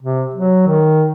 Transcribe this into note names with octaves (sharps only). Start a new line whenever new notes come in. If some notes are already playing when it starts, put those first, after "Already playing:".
C3
F#3
D#3